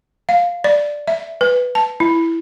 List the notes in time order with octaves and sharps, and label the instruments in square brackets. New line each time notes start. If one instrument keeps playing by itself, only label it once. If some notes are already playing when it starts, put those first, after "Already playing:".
[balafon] F5
D5
E5
B4
A5
E4